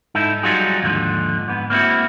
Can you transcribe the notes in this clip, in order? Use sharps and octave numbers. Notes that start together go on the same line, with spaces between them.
G#2 D#4 E4 A4
F#3 G3 D#4 F4 F#4 G#4
D#2 G#2 D3 F3
G#2 B3
A#3 C4 E4 F#4